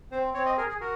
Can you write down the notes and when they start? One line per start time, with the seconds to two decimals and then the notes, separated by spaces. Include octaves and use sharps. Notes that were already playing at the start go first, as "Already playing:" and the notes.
0.11 C4 C5
0.34 C4 C#5
0.46 D#5
0.57 G#4 A#4
0.69 G#4
0.81 F#4 A#4